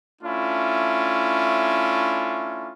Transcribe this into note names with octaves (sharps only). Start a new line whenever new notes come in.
A3 C#4 D4 E4 F4